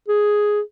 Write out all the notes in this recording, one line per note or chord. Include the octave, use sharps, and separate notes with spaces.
G#4